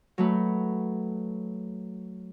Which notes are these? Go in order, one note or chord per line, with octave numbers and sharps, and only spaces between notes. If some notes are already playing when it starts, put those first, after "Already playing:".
F#3 A3 B4